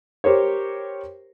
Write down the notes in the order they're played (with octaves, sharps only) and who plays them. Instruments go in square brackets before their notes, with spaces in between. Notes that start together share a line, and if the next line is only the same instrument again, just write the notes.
[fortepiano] G4 A#4 C5 C#5